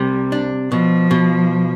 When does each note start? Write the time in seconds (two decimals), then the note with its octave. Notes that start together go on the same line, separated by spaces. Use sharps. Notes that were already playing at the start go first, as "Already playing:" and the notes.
Already playing: C2 C3 G3
0.32 D4
0.72 B2 F3
1.11 B2